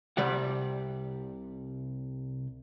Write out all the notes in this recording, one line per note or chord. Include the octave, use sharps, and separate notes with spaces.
C2 C3 G3 D5 F#5